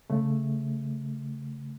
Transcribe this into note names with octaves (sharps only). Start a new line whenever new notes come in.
C#3 A3